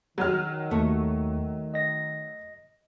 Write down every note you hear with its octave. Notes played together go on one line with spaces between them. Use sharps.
D#3 F#3 F6
D#2 A3 C#6
D#5 A#6